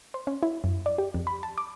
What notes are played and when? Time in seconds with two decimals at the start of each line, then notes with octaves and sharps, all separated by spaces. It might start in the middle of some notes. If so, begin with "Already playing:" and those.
0.14 C5
0.27 C#4
0.43 E4
0.64 F#2
0.86 D5
0.98 G4
1.14 F2
1.27 B5
1.43 A5
1.58 D6